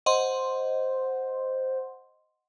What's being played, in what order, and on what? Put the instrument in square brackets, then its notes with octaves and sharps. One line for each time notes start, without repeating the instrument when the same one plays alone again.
[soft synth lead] C5 [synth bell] D#5 F#5 C6